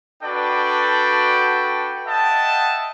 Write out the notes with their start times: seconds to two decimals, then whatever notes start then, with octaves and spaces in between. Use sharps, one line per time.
0.23 D4 F#4 A4 B4 D5 G5
2.06 D#5 E5 F#5 G5 A5